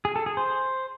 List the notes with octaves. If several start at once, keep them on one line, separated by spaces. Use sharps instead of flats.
G#4
A4
G#4
C5